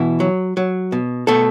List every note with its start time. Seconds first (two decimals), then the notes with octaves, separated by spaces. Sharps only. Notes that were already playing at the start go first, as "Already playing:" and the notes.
Already playing: B2 E3 E4
0.20 F#3
0.57 F#3
0.92 B2
1.27 B2 A3 A4